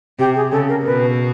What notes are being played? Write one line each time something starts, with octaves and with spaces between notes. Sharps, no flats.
C3 G4
G#4
C#3 A4
A#4
B2 B4